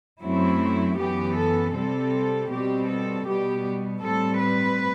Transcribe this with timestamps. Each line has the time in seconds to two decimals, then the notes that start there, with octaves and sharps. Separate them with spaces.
0.20 F#2 F#3 A3 C4 E4
0.96 F#2 E3 B3 G4
1.35 A4
1.73 C3 G3 C4 A4
2.50 B2 G3 C4 G4
2.88 A4
3.26 B2 G3 B3 G4
4.03 A2 G3 C4 A4
4.41 B4